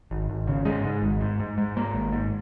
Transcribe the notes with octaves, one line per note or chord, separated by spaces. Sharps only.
G#1
G#1
C#3
G#2 G#3
G#2
G#1
G#2
G#2
G#2
G#2 A#3
G#1
G#2